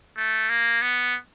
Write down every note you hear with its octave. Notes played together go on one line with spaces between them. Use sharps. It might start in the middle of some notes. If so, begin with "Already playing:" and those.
A3
A#3
B3